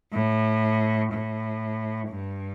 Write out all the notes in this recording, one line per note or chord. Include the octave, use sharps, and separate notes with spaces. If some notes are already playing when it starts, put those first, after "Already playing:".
A2
A2
G2